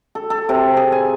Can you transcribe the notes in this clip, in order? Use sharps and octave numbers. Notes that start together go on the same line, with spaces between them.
A4
A4
C3
G#4
G#5